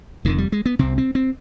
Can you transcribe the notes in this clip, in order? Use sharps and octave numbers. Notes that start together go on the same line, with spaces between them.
F1 F2 D3 D#3
G3
G#3
B3
C2 C3 C4
C4
C4